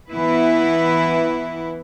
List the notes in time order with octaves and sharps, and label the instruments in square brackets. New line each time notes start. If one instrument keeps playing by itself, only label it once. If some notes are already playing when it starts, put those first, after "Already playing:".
[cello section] E3 B3 E4 B4